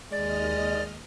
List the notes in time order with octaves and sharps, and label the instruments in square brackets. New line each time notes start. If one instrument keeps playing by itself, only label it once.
[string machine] D#2 D#5 F6 [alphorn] G#3 [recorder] D5